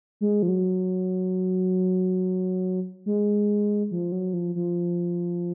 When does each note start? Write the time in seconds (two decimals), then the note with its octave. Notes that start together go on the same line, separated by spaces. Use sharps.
0.21 G#3
0.42 F3
0.49 F#3
3.06 G#3
3.91 F3
4.12 F#3
4.33 F3
4.55 F3